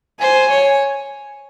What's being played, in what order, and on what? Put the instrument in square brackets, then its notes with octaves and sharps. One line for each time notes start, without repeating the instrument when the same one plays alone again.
[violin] C5 [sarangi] G#5
[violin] C#5